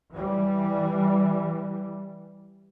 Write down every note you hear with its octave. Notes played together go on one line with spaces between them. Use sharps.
E3 G3